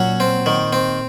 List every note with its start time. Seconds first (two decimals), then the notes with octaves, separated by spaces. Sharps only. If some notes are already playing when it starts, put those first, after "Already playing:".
Already playing: A#2 F#3 C#4
0.20 C4
0.46 D#3
0.73 C4